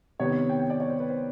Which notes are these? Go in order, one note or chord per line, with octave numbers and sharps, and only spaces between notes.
C3 D#3 G3 B3 C#5
G5
G5
D5
C#5
C5
B4
C5